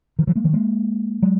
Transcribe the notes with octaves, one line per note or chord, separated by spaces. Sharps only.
D#3 F3
E3 F#3
G#3 A#3
D#3 F3
G#3 A#3
F#3 G#3